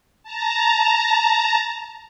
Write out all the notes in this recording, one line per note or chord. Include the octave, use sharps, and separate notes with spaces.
A5 A#5